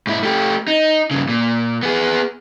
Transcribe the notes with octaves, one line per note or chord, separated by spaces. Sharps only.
G#2 E4
A3 G4
D#4
G2 C#3
A#2
B3 G#4